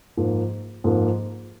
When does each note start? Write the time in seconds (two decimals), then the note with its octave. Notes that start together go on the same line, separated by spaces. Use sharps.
0.17 G#2 F3 A#3
0.84 G#2 F3 A#3